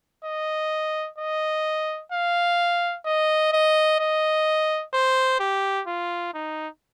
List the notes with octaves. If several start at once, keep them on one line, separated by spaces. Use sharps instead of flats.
D#5
D#5
F5
D#5
D#5
D#5
C5
G4
F4
D#4